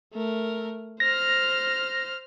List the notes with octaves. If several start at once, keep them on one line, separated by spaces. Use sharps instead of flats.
A3 A#4
C5 F6 A#6